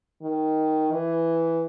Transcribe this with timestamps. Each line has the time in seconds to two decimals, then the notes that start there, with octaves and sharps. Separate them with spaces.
0.23 D#3
0.92 E3